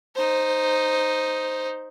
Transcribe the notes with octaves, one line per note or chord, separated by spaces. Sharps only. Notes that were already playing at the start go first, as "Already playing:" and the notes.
D#4 C5